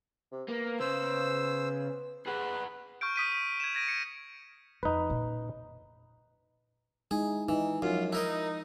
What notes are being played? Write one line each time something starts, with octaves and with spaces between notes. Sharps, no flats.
C3
A#3 B3
C#3 C5 E6
G#4 B4 F#5
C#6 F6 G6 D7
D#6 B6 D#7
B6
G#6 E7
G#6 A#6 D7 D#7
C#7
F2 D#4 B4
A#2 C#3
G#3 D#4 E4 G#4
E3 D#4 E4
F#2 F3 F4
D#4 E4 A#4 D#5